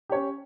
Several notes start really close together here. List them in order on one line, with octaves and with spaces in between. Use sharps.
G4 C#5 C#4